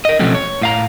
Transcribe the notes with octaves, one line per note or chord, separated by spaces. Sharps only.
A#4 D#5
B2 F3 F#3 A3 C4 C#4
C#5
A2 F5 A#5